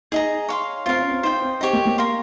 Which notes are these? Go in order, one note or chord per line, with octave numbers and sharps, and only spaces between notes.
D#4 G#4 D#5 A#5
C#5 F5 C6
C4 F4 A#4 F5
C#4
C4
D#4 C5 D#5 G5
C4
C4 D#4 G4 C#5
A#3
A#3
A#4 F5 C6